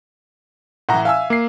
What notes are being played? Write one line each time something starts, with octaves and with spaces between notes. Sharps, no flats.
A2 E3 F#5 A#5
E5 F5 G#5 E6
A#3 C7